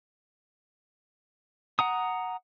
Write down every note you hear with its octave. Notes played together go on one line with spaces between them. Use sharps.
F#5 A#5 D#6